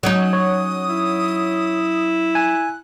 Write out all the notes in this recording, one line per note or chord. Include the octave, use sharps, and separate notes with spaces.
F#3 C#4 D#4 D#6
C#5
E4
G#5 F#6